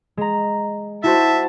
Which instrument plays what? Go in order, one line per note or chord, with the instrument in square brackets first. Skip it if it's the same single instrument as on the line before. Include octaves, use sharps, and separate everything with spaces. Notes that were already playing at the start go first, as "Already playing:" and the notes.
[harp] G#3 A#5
[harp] E4 F#4 C5 [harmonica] E5 [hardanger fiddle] A5